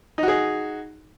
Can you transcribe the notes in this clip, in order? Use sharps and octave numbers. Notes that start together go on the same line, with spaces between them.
D#4 F#4 G#4